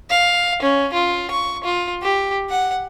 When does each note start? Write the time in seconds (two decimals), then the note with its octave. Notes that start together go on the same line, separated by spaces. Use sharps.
0.10 F5
0.62 C#4
0.93 F4
1.31 C#6
1.64 F4
2.03 G4
2.50 F#5